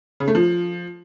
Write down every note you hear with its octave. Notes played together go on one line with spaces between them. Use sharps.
C#3
A3
F3